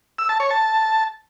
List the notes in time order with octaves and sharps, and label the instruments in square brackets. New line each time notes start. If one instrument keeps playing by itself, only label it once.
[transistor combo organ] E6
A5
C#5
A5